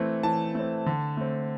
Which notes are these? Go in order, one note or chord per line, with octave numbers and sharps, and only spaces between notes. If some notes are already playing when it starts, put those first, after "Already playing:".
Already playing: E3 A3 C4
E3 A5
A3 C4
D3
A3 C4